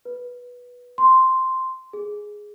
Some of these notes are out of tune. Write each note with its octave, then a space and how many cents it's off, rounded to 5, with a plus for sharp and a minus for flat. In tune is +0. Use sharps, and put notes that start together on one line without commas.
B4 -10
C6 -5
G#4 +5